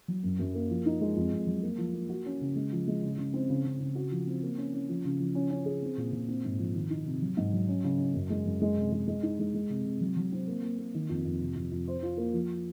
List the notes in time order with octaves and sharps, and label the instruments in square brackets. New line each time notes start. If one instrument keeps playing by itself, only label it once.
[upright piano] F#3
F#2
F#2
A#3
F3
D#4
G#3
F2
F2
F#3
A#3
F3
A#3
F#4
C#4
C#3
G#3
F3
G#3
C#3
C#3
C4
C#3
C#3
C#3
F#4
F3
C4
A#3
C#4
C#4
F3
C#3
F3
C#4
C#4
G#4
C4
A#2
A#2
C4
G#2
F3
D#3
D#4
C3
F#3
G#2
F#3
C#4
C#3
C#4
F#2
G#3
F#2
G#3
C3
G#3
G#3
D#4
G#3
G#3
C3
C3
F#3
F#3
C4
A#3
A#3
A#3
D#3
F2
F2
C3
F2
F2
C5
F4
A#3
F3